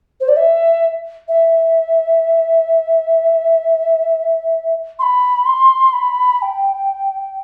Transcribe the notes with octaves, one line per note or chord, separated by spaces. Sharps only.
C5
D5
E5
E5
C6
B5
C6
B5
B5
G5